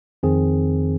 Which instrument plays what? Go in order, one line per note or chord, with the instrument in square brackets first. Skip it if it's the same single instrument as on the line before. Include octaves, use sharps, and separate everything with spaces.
[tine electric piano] F2 D#3 C4 G#4